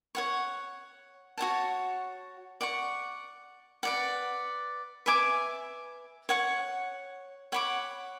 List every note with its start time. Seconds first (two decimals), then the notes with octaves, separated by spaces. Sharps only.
0.15 C#5 F#5 C#6
1.38 F#4 C#5 F#5 A5
2.61 D5 F#5 C#6
3.83 B4 D5 F#5
5.06 B4 E5 G#5 D6
6.29 C#5 F#5 C#6
7.52 C#5 F#5 B5 D6